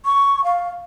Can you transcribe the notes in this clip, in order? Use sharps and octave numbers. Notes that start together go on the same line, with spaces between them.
C#6
F5